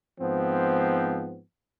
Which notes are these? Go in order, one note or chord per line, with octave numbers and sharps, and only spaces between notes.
G#2 F3 B3 C4